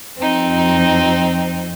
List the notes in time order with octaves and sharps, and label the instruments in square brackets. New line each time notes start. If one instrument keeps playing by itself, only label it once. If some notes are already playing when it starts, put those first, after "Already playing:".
[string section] F2 [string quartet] C4 D#4